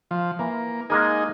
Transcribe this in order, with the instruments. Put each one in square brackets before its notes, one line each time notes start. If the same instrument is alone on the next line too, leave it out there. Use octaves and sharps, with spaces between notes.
[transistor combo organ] F3
[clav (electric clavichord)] E3 [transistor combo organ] A#3
[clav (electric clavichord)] G#3 A#3 A#4 [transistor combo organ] D#4 G#4